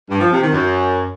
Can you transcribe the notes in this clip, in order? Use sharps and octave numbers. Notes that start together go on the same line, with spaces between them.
G2
F3
C3
D#3
F#2